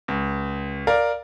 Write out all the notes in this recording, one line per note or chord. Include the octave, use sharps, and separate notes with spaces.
C#2
A#4 D5 F5